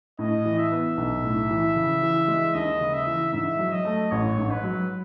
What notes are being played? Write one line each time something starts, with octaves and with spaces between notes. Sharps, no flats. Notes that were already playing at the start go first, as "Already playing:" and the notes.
A2 D#5
E3
E5
B3
B1
A2
E3
C#3
E3
G#3
D#2 D#5
C#3
E5
E3
G#2 E5
F#3
D#5
A3
A1 C#5
G#2
B4
F#3